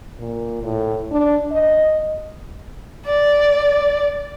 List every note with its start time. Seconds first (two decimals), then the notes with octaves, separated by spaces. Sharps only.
0.19 A#2
0.63 A2
1.11 D4
1.51 D#5
3.06 D5